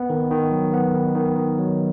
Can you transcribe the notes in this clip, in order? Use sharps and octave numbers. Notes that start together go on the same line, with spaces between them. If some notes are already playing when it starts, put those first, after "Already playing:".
Already playing: B3
D#3
D#3
F#3
B3
D#3
D#3
D#3
F#3